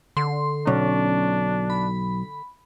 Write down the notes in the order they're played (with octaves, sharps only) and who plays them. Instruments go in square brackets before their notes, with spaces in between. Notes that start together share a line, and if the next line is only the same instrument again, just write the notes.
[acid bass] D3 [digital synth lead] C6
[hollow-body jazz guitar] B1 [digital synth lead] C#4 [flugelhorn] D4
[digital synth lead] B5